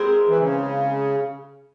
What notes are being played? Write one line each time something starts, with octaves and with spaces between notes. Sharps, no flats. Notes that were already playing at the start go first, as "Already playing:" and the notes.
Already playing: G#3 C4 E4 A#4
E3
C#3